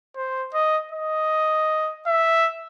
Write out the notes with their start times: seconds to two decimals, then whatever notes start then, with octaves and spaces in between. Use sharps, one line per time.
0.16 C5
0.54 D#5
0.92 D#5
2.07 E5